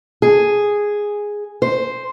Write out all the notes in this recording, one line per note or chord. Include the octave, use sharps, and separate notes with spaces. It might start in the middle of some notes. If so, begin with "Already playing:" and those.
G#4
C5